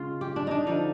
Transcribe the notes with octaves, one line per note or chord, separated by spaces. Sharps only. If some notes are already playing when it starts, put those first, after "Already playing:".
Already playing: C#3 G#3 F4
G4
D4
D4 D#4
D3 F3 D#4